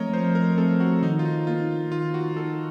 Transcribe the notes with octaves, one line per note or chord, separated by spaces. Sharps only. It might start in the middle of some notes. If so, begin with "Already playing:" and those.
Already playing: F3 A3 C4 A#4 C#5 D#5
F3 C5
A#4
A3 C4 A4
F#4
D#3 D#4
F4
D#4
A#3 D#4 F4
D#3 F4
F#4
A#3 D#4 A4